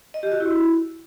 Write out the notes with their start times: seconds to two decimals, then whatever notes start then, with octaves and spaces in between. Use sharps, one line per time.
0.14 D#5
0.23 G4
0.32 F#4
0.40 E4